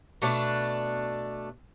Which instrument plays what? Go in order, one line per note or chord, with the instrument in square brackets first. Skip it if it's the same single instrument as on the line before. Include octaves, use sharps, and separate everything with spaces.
[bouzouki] B2 A3 D4